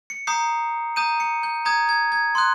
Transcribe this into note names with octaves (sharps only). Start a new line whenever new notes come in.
C#7
A#5 D#6 G6 C7
A#5 D#6 G6 D#7
C#7
G6
A#5 D#6 G6 G#6
G#6
G#6
C6 D#6 F#6